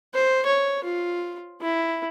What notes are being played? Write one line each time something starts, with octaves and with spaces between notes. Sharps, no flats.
C5
C#5
F4
E4